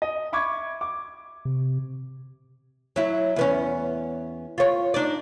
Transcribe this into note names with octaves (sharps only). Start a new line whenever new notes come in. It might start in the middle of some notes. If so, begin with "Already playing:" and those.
D#5
E5 B5 C#6 D6 G#6
D6
C3
F#3 E4
E2 B3 C#4
F4 C#5
D4 D#4 D5